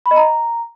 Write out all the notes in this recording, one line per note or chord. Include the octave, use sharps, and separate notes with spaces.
B5
D#5
A#5